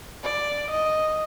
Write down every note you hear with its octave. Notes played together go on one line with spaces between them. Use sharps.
D5
D#5